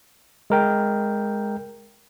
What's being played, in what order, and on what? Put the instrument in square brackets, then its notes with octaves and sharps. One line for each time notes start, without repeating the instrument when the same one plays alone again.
[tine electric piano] G#3 A#4 G5